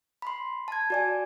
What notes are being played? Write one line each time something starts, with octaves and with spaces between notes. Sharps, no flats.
B5 C6
A5 G#6
F#4 D5 G#5